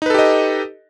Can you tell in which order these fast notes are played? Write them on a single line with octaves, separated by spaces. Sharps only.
D#4 B4 A4 G4 D#5